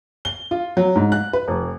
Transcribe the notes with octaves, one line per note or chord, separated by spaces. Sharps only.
G7
F4
F#3
G#2
F#6
B4
F1